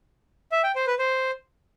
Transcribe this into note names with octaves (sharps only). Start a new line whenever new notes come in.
E5
G5
C5
B4
C5